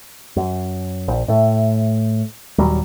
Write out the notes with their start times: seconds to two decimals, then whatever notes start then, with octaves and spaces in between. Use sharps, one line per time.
0.36 F#2
1.08 A#1
1.28 A2 A3
2.58 D#1 D#2 F#3 G3